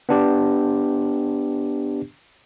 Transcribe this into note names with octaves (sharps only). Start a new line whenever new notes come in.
B3 D4 G4